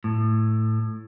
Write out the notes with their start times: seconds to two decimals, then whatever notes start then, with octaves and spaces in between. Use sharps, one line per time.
0.04 A2